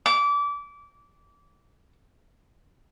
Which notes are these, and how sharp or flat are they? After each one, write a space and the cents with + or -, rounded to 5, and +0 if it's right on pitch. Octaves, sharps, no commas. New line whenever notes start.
D6 -25